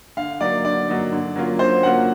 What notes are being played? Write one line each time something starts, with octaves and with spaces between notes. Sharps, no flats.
D3 F5
F#3 A#3 D#4 D5
D3 D5
F#3 A#3 D#4
D3
F#3 A#3 C#4 F4
D3 C5
F#3 A#3 C#4 F4 F#5